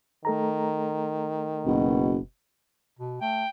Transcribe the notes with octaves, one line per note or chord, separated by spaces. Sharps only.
D#3 A3 A4 A#5
F#1 B2
B2
A3 G5